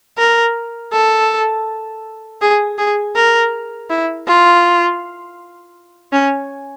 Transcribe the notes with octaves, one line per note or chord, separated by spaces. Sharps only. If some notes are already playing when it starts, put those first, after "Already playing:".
A#4
A4
G#4
G#4
A#4
E4
F4
C#4